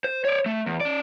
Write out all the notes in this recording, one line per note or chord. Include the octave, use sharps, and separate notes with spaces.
C5
C#5 D5
A3
E2
C#4 D5